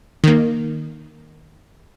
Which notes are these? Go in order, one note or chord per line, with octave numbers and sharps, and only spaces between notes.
D#3 A#3